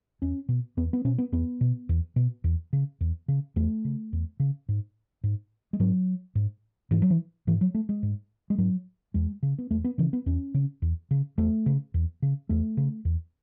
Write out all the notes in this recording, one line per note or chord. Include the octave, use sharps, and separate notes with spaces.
E2 C#4
B2
E2 B3
B3
B2 C#4
B3
E2 B3
B2
E2
B2
E2
C#3
E2
C#3
E2 A3
C#3
E2
C#3
G#2
G#2
G#3
G#2 F#3
G#2
G#2 E3
F#3
E3
G#2 E3
F#3
A3
G#3
G#2
G#3
G#2 F#3
E2 G#3
C#3
B3
E2 A3
B3
C#3 E3
B3
E2 C#4
C#3
E2
C#3
E2 A3
C#3
E2
C#3
E2 A3
C#3
E2